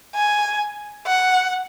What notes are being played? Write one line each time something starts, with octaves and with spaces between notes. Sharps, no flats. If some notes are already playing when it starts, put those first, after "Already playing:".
G#5
F#5